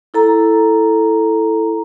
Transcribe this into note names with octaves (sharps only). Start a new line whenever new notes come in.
E4 A4 A#5